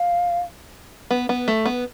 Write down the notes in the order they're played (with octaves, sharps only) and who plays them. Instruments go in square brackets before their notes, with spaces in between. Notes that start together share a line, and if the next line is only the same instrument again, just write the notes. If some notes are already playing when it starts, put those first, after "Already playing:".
Already playing: [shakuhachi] F5
[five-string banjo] B3
B3
A3
B3